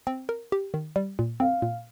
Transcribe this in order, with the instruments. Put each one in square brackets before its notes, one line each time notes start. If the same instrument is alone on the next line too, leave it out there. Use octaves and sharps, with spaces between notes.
[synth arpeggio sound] C4
A#4
G4
D#3
G3
A#2
[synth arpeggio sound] C4 [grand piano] F5
[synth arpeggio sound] A#2